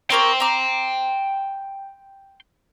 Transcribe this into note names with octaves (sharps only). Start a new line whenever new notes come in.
G4 A#4 C#5 G5 C6
A#5 D6